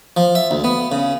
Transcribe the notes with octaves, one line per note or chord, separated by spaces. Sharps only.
F3
E5
D2
B3
C#3